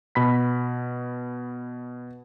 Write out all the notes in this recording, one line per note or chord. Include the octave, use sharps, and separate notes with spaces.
B2 B5 B6